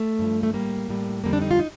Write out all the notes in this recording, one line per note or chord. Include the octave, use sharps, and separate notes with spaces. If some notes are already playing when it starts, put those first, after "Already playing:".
Already playing: A3
G2 F3
A3
A2 G3 A#3
A2 G3
F2 D3 G3 A#3
D4
D#4
F4
D#4